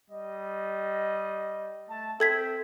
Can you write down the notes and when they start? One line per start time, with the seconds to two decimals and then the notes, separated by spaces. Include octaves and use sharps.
0.11 G3 D#5
1.89 A3 A5
2.20 C4 A4 E5 G5 G#6 B6